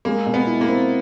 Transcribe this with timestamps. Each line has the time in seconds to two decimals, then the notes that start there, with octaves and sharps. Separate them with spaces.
0.05 G#3 A#3
0.26 B2
0.34 B3
0.47 E4
0.61 A#3
0.68 C4